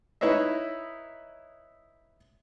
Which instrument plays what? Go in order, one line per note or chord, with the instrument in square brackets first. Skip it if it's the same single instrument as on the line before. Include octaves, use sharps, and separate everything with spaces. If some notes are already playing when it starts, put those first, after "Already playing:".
[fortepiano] D#4 E4 B4 C#5 D#5 E5